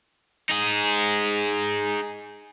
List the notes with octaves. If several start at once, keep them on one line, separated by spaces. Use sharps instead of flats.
D#4 G#4